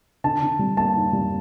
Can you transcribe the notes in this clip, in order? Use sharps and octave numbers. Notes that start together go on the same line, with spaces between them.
D3 A5
D3
G3
A#3 A5
D#4
G3